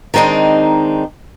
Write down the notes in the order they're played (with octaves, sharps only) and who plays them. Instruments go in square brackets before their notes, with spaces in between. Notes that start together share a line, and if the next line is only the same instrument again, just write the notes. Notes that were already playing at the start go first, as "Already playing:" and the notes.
[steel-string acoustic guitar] D#3 G#3 C4 D4 D#4